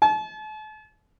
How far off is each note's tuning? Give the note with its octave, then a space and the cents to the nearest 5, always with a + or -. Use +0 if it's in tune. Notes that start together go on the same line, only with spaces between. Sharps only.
A5 -40